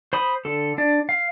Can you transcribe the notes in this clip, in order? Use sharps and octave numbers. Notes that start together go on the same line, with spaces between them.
C5 B5 D#6
D3 A4
D4 D5
F5